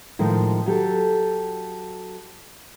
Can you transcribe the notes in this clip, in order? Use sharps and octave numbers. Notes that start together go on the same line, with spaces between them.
A2 D#3 F3 G#3
F#3 G4 A4